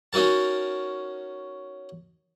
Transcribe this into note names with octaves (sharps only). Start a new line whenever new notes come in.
C#4 D#4 F#4 A#4 A5